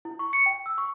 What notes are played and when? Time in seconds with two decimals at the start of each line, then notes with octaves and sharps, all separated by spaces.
0.05 E4
0.19 C#6
0.33 C#7
0.46 G5
0.66 E6
0.78 C#6